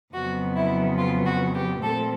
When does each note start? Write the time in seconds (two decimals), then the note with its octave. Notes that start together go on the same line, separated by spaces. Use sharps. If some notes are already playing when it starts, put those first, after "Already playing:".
0.14 F2 C#3 F#3 B3 F#4
0.56 E4
0.98 F4
1.26 F#4
1.55 G4
1.82 A#2 F3 A3 C4 A4